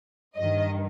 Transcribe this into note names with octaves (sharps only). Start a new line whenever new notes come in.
G2 D#3 D#5